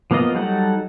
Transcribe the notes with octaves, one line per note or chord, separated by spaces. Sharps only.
F3 A#3 B3 F4 D#5
F#3 G3 D#4 A4 F#5